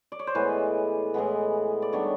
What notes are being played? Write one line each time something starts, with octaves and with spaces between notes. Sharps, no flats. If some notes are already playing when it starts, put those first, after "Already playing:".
D5
C#5
C5
A2 E3 G#3 B3 B4
A2 E3 G#3 B3
D5
D#3 G3 B3 D4 C#5